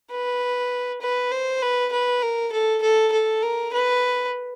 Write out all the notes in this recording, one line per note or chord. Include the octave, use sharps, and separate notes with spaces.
B4
B4
C5
B4
B4
A#4
A4
A4
A4
A#4
B4